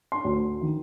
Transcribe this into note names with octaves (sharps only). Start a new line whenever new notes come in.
C6
D2
D#3